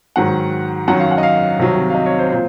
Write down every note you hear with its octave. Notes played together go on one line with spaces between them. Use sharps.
G#2 D#3 F#3 F#5
F#2 D#3 F#3 F#5
F5
F#5
D#5
F5
C2 C3 D#3 F#3
F5
D#5
C#5
C5
A#2 C5